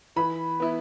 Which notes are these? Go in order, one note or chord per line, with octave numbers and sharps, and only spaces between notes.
E3 B5
B3 E4